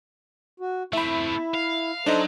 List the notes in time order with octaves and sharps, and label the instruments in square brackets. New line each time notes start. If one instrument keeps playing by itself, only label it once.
[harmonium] F#4
[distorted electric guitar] A3 C4 [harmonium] E4 [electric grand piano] E5 B5
[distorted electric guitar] F5
[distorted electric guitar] F#3 [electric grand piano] D4 D#4 D#5 [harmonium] A4 C5